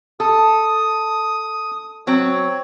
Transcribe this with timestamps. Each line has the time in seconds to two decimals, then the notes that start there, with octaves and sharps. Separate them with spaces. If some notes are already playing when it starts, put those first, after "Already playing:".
0.20 A4 D#6
2.07 F#3 C4 C#5